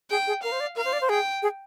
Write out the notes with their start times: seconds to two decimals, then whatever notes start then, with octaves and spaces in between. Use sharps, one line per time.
0.10 G#4 G5
0.27 G#4
0.43 A#4 F5
0.52 C5
0.60 D5
0.76 A#4 F5
0.85 C5
0.93 D5
1.01 C5
1.09 G#4 G5
1.42 G#4